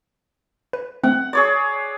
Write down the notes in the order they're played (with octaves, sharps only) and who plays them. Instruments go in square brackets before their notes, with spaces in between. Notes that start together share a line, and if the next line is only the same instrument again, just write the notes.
[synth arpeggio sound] B4
[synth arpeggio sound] A3 C4 [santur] F#5
[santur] G#4 C#5 D5